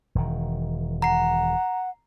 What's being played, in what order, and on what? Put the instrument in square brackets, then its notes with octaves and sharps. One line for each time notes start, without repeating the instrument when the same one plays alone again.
[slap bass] E1 D#3
[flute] F#5 [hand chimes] A#5 C7